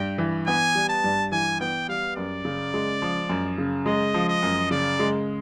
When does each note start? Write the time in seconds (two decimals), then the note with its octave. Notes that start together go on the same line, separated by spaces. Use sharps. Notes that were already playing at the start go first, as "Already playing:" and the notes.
Already playing: G2 G5
0.18 E3
0.47 B3 G#5
0.75 G3
0.89 A5
1.04 G2
1.32 E3 G#5
1.60 B3 G5
1.89 G3 F5
2.16 F#2 D5
2.45 C#3
2.74 G#3
3.02 F3
3.29 F#2
3.58 C#3
3.86 G#3 D#5
4.14 F3
4.29 D#5
4.43 F#2
4.71 C#3 D5
4.99 G#3